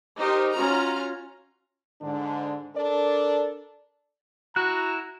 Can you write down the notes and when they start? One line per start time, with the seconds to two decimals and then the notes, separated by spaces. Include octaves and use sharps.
0.17 D#4 G4 A#4 C5
0.53 C#4 F4 F#4 A#5 F6
2.01 G#2 D3 D4
2.76 D4 A4 A#4 D5
4.56 E4 F#4 A#5 F#6